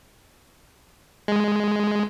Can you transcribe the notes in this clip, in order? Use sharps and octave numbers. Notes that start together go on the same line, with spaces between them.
G#3